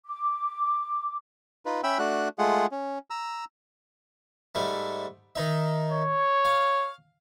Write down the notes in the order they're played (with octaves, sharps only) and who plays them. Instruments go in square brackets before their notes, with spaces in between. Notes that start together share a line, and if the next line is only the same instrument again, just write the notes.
[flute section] D6
[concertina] D#4 F4 B4
C#4 E5 G5 B5 E6
A3 D4 F#4 F#6
G#3 A3 F4 G#4 F#5
C#4
A#5 E6
[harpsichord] G#2 G3 A3
D#3 D#4 E5
[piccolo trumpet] C#5
[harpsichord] F5